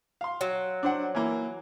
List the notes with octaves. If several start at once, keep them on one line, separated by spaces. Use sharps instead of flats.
F5 C6
F#3
D4 C5 F#5
E3 A#3